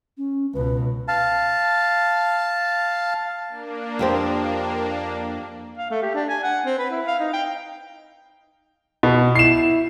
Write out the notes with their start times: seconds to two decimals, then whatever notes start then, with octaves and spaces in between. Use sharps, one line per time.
0.18 C#4
0.54 C#2 B2 B4
1.08 F5 A5
3.48 A#3 D4
3.99 F2 G4 C5
5.78 F5
5.91 A3
6.02 G4
6.15 D4
6.29 G#5
6.43 F#5
6.65 C4
6.79 B4
6.91 E4
7.07 F5
7.20 D#4
7.33 G5
9.03 B2
9.35 E4 C7 E7